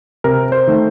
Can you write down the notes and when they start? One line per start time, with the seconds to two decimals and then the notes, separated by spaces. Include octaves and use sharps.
0.24 C3 A#4
0.52 C5
0.67 D#3 A3